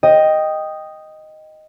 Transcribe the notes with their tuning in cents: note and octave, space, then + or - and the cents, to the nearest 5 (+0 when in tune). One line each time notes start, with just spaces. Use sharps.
D#5 +0 G5 +0